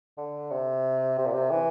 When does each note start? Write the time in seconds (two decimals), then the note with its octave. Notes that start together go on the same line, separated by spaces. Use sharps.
0.17 D3
0.51 C3
1.18 C3
1.26 A#2
1.33 C3
1.51 E3